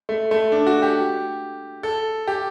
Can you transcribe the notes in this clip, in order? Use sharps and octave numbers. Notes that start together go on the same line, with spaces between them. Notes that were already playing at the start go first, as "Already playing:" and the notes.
A3
A3
D4
F#4
G4
A4
G4